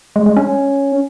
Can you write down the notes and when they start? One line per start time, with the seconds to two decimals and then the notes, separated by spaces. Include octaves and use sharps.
0.16 G#3
0.26 G#3
0.36 C#4